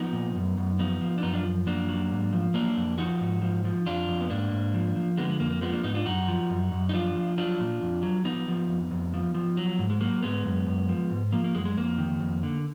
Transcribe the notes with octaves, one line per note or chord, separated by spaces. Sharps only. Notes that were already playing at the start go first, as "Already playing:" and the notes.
Already playing: F3 B3 D#4
A#2
F#2
F#2
F3 B3 D#4
F3
D4
F#2 B3 D#4
D4 F4
F3
F#2 A#3 D4
F#3
G#2
F3
F#3 A#3 D4
F2
F3 D#4 F#4
G#2
F3
F3
F2 D4 F4
F2
B3
G#2 A#3 D4
G#2
F3
F3
D3 G#3 B3
G#3
F2 A#3
A#3
F3 G#3 B3
A#3 D4
G#2 B3 D#4
D4 F4
F#2 D#4 F#4
F3
F#2
F#2
D#4
F3 D4 F4
F3
F#3 D4 F4
A#2
F2
F#3
F3 B3 D#4
F3
F2
F2
F3
F3
F#3
G#2
G#3
F#3 A#3
G#2 G#3 B3
F#2
F#2
F3
G#2
F3 A#3
A#3
F#2 G#3
G#3
F2 A#3
D#3
F2
D3